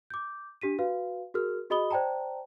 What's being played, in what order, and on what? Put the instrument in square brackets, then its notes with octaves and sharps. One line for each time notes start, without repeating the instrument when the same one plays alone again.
[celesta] D6 G6
D4 G4 B6 D#7
F#4 B4 F5
F#4 G#4 A#4 F6
F#4 G#4 D#5 B5 D#6 G7
C5 D5 G5 A5 A#5